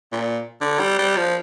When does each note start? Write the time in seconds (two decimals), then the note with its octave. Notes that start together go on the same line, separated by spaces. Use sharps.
0.12 A#2
0.61 D3
0.80 G3
0.99 G3
1.17 F3